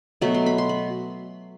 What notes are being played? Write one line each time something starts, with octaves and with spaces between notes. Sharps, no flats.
B2 F#3 A3 B5
C6
B5
C6
B5